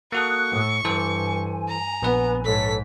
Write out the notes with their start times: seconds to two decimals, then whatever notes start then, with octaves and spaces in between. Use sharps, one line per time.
0.12 A#3 F#4 A4 C#6 D#6 F#6
0.51 A2
0.85 G2 E3 A4 C5 G#5
1.69 A#5
2.02 A#1 B3 B4
2.45 G#2 A4 C#5 B6